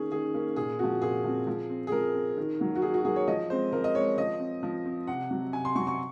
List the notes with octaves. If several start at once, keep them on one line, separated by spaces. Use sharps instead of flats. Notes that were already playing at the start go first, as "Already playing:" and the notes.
Already playing: D#3 A#3 C#4 G#4
D#3 G#4
A#3 C#4
A#2 G#4
F3 C4 F#4
A#2 G#4
F3 C4
F3
C4
G#4
F3 A#4
C4
D#3
F#3 A#3
F#4
D#3 G#4
F#4
F#3 A#3 G#4
C#5
F3 D#5
G#3 C4 C5
F3 A#4
D#5
G#3 C4 C#5
F3 D#5
C4
F3
C4
C3 F#5
F#3 C4
C3 G#5
C6
F#3 C4 C#6
C#6